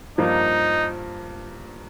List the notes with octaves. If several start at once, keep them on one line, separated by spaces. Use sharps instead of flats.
G2 F3 A#3 D#4